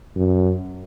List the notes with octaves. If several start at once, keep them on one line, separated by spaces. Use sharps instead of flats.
F#2